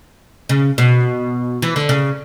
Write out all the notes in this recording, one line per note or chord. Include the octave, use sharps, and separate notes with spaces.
C#3
B2
E3
D3
C#3